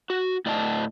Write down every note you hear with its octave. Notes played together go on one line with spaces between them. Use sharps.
F#4
A2 D5 D#5 A5